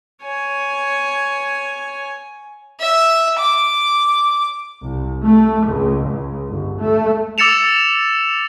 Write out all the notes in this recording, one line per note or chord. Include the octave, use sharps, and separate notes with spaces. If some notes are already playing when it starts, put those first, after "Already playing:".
C#5 G#5
E5
D6
C2
A3
C#2
C#2
G1
A3
D6 E6 A6 C#7 E7 F7